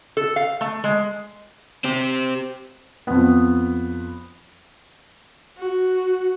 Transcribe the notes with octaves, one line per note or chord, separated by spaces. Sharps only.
A4
F5
A3
G#3
C4 G4
F2 B3
F#4